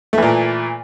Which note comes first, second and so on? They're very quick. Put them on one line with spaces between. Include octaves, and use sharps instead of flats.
A3 E3 A#2